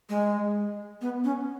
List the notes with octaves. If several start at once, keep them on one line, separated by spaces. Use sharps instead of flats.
G#3
B3
C#4